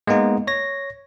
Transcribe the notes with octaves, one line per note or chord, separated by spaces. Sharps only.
G#3 A#3 B3 D#4
C#5 A#6